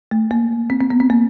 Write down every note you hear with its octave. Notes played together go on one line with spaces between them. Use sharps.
A3
A#3
C4
C4
B3
C4
A#3